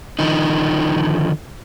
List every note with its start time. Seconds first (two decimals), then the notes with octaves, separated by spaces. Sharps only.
0.19 D3 D#3 F3 D#4